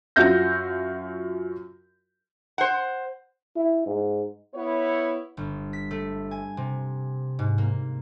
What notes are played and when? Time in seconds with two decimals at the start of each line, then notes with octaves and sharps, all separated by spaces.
0.16 F#2 F4 F#4 E5 G6 A#6
2.58 C5 F#5
3.56 E4
3.86 G#2
4.54 B3 E4 C#5
5.37 G1
5.73 B6
5.91 A3
6.31 G#5
6.57 C3
7.39 G#2
7.58 A#3